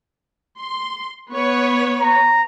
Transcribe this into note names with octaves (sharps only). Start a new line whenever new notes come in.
C6
B3 B4 C#5
A#5